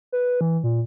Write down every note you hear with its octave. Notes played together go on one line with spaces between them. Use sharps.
B4
E3
A#2